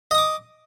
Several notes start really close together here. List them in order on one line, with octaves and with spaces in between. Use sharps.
D#5 D#6 D6